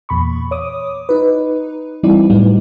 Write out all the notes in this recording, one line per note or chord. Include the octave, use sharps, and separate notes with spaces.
E2 A#2 B5 C#6
C#5 D6 D#6
D#4 B4
E3 G3 C4 D#4 E4 D5
A2 F#3 G3 B3 D#4